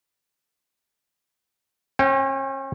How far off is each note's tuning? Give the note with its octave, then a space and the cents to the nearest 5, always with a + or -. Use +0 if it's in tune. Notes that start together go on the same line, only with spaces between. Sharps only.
C#4 -40 G5 +0